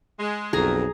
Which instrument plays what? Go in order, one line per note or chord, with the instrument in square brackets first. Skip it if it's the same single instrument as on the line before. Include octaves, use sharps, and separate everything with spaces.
[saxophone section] G#3
[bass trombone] B1 [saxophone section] F2 [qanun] G#4 A#5